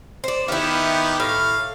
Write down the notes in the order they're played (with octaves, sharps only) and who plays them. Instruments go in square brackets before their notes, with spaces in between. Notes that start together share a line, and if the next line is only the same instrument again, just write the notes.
[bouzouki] C5 D5
[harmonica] D#3 B3 G4 [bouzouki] E4 F5
[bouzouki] A2 [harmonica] F5